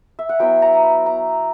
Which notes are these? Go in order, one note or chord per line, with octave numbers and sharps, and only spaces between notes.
E5
F#5
F#3 B3 E4 G5
A#5
B5
A#5